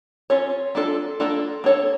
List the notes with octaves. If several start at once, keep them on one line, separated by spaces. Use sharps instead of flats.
C#4 F4 C#5
A#3 D4 F4 A4
A#3 D4 F4 A4
A#3 D4 A4 C#5